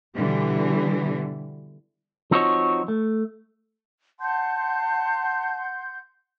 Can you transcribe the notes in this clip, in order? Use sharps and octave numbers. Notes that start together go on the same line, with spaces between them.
B2 D3 E3 G3
F3 C4 D#4 F#4 C5 C#5
A3
F#5 A5 C6 G6